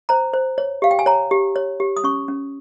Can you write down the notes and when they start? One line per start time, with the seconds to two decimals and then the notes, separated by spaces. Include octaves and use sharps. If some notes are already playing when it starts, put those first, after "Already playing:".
0.09 C5 A#5
0.34 C5
0.58 C#5
0.82 G4 F5
0.91 G5
0.99 G#5
1.06 C#5 A#5
1.31 G4
1.56 C#5
1.80 G4
1.97 D#6
2.04 C#4 C#6
2.28 C#4